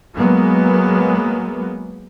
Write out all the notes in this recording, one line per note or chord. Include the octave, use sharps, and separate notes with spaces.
F#3 G#3 A#3 B3